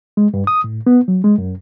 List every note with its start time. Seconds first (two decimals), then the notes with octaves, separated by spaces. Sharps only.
0.17 G#3
0.34 G2
0.47 D#6
0.64 A2
0.87 B3
1.08 F#3
1.24 G#3
1.38 F#2